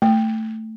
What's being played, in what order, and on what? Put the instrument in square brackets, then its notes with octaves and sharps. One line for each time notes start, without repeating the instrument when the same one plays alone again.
[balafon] A3